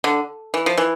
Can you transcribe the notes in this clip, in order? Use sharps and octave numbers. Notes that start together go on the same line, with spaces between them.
D3
E3
F3
E3